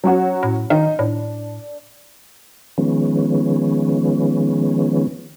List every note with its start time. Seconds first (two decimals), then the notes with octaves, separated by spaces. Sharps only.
0.04 F#3 C#4 F#4
0.43 A2
0.70 D#3 D#4
0.99 A2 D4
2.78 D#3 F3 G#3 B3 C#4